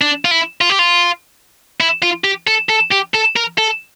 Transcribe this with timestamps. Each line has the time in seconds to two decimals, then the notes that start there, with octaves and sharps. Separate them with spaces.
0.01 D4
0.25 F4
0.31 E4
0.61 F4
0.70 G4
0.79 F4
1.80 E4
2.03 F4
2.24 G4
2.48 A4
2.70 A4
2.92 G4
3.15 A4
3.36 A#4
3.58 A4